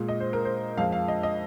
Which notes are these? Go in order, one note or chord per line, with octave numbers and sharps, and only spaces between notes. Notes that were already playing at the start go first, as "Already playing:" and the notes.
Already playing: A#2 G#3
D#5
C5
A#4
C5
F2 F3 G#3 F5
F5
D#5
D#5